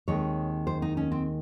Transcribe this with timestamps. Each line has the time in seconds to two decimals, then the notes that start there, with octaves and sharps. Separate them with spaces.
0.08 D#2 D#3 G#3 C4 C#5
0.67 C5
0.82 D#4
0.97 C#4
1.12 C4